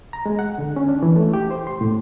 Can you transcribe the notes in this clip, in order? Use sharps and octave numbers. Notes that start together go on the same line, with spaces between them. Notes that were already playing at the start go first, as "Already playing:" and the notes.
A#5
G#3
F#5
D3
C#4
D4
E3
A3
G4
C5
C6
A2